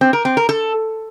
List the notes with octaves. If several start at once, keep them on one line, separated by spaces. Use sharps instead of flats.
C4
A#4
C4
A#4
A4